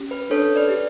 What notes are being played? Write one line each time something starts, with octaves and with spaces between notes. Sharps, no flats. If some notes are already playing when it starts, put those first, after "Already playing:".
Already playing: C#4 G4
B4
D4 A4 C#5
B4 D5
G4